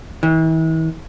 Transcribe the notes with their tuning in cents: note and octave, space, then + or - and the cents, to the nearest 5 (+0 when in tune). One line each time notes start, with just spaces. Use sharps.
E3 -40